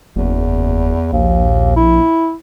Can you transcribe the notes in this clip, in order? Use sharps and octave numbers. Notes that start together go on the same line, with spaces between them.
F#1 E2
A#1 D#2
E4